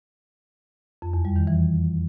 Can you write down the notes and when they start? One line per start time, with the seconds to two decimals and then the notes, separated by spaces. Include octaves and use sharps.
1.02 F2
1.13 E2
1.25 G3
1.36 D#3
1.47 E3